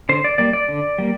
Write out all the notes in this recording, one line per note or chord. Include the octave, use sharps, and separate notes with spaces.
D3 C5
D5
G3 A#3 D5
D5
D3
G3 A#3